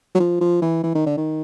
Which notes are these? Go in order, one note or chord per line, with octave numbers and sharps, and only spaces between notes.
F#3
F3
F3
E3
E3
D#3
D3
D#3